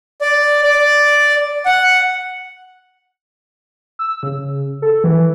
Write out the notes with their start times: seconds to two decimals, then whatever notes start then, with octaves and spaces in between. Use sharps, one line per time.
0.21 D5
0.64 D5
1.65 F#5
3.99 E6
4.23 C#3
4.82 A4
5.04 E3